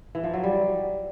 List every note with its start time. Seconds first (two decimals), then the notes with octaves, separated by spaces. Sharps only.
0.15 E3
0.24 F3
0.33 F#3
0.44 G3